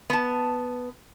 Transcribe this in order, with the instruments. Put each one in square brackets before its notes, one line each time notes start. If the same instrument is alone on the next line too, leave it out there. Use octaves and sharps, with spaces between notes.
[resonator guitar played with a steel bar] B3 A5